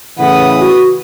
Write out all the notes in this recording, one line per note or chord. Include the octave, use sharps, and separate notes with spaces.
A2 C#3 E3 B4 F#5 D#6
F#4